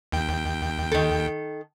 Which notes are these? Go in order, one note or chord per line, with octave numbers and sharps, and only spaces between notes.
D#2 G5
D#3 A4